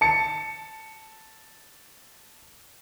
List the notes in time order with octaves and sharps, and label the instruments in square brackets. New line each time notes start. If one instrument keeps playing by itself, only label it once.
[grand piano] A5 C#7